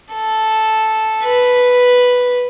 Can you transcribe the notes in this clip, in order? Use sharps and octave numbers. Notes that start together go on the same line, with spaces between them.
A4
B4